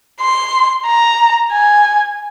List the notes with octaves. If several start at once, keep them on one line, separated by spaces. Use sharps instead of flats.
C6
A#5
G#5